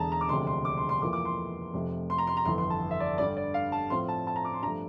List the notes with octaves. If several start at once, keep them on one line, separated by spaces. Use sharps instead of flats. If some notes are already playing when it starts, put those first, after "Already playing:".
Already playing: E1 E2 D3 A5 A#5
A#5
D6
E1 D2 C3 F3 C6
C6
D6
C6
C6
F2 E3 A#3 F4 D6
D6
C6
F1 F2 C3 F3 A3
C6
A#5
C6
A#5
G1 F2 E3 C6
C6
A5
E5
D5
G2 D3 G3 D5
D5
F5
A5
A2 F3 C4 F4 C6
A5
A5
A#5
D6
C6
G2 F3 A3 A#5